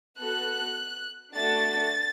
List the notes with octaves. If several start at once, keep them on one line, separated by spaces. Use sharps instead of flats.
B3 F#4 A4 F#6
A3 D4 F#4 A4 A6